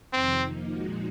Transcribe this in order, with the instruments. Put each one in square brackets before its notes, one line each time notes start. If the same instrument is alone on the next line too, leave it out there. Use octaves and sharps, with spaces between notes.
[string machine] F2 C3 D#3 [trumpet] C4
[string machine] F3 A#3 D#4
A#2 F3 G#3 D#4 F#4